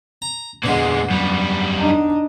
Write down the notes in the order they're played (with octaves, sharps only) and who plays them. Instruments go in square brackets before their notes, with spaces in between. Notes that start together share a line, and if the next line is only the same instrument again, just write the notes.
[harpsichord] A#5
[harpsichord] E2 D3 [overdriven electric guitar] A#2 G#3
[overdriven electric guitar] F#2 G3
[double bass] D4 D#4